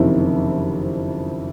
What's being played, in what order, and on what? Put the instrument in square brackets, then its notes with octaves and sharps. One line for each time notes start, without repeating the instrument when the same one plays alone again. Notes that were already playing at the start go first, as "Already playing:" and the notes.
Already playing: [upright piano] F#1 F2 C3 D#3 E4 E5